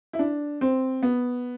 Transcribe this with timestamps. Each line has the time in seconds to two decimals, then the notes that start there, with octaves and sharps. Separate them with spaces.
0.13 E4
0.19 D4
0.61 C4
1.03 B3